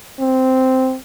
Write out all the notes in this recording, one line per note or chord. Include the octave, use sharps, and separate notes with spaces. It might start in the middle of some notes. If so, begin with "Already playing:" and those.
C4